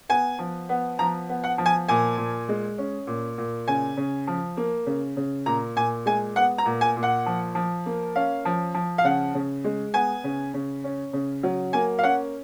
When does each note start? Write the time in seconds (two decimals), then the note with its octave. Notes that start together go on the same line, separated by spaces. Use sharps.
0.09 B3 G#5
0.39 F3
0.69 B3
0.99 F3 A#5
1.29 B3
1.44 F#5
1.58 F3
1.66 G#5
1.88 A#2 G#5
2.18 A#2
2.49 G#3
2.78 C#4
3.07 A#2
3.38 A#2
3.68 C#3 G#5
3.97 C#3
4.27 F3
4.57 A#3
4.86 C#3
5.17 C#3
5.46 A#2 A#5
5.76 A#2 G#5
6.06 G#3 G#5
6.36 B3 F#5
6.58 A#5
6.65 A#2
6.81 G#5
6.96 A#2
7.03 F#5
7.26 F3
7.55 F3
7.86 A#3
8.16 C#4 F5
8.45 F3
8.74 F3
8.98 F5
9.04 C#3 F#5
9.35 C#3
9.64 G#3
9.94 B3 G#5
10.24 C#3
10.54 C#3
10.84 C#4
11.13 C#3
11.43 F#3
11.73 A#3 G#5
11.99 F5
12.03 C#4 F#5